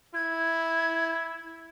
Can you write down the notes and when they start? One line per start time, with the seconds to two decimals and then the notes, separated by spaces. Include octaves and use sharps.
0.15 E4 G#6